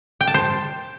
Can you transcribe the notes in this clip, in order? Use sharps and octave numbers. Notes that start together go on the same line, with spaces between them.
G5
A5
C5